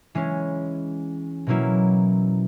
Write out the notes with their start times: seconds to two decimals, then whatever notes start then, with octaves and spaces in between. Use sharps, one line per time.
0.15 E3 G#3 C#4
1.47 B2 F#3 A#3 C#4 E4